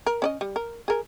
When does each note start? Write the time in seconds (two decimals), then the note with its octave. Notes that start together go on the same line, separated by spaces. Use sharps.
0.06 A#4
0.22 C#4 D5 D#5
0.41 G3
0.56 A#4
0.88 G#4 A#4